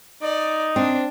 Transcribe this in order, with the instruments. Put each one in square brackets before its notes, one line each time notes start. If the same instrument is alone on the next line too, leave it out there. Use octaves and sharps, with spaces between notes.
[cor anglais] D#4 [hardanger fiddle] D5
[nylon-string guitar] C4 [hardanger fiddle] D4